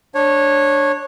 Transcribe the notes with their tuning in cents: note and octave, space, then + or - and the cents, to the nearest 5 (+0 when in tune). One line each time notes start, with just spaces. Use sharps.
D4 +0 C#5 -15